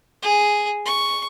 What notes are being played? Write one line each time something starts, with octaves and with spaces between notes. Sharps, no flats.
G#4
C#6